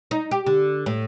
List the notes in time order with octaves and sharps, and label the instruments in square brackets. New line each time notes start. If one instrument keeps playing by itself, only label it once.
[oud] D#4
G4
D3
A2